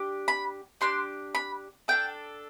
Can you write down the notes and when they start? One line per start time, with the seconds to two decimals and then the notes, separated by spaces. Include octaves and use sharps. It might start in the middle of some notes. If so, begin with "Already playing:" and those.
Already playing: D4 G4
0.28 B5
0.81 D4 G4 C6
1.35 B5
1.88 D4 A4 G5